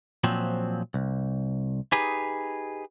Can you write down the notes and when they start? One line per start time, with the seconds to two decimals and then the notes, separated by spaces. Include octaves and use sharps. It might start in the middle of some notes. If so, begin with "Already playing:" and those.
0.24 A#2 F3 F#3 C4
0.94 C2
1.92 D#4 G4 G#4 B4